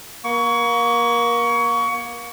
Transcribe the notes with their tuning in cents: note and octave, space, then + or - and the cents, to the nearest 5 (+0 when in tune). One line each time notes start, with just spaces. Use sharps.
A#3 +30 C#6 +25